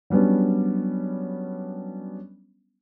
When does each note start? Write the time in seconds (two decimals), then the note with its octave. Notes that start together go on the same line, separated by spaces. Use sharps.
0.10 F#3 G3 B3 C#4 D4